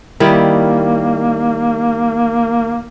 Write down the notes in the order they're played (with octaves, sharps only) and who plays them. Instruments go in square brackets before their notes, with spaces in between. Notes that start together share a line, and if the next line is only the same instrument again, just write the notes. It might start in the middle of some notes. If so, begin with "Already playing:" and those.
[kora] D#3 G3 E4 [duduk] A#3